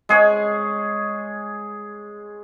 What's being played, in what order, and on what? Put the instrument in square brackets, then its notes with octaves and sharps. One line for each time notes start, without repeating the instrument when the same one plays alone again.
[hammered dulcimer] G#3 G#4 C#5